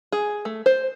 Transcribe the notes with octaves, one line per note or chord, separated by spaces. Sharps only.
G#4
A3
C5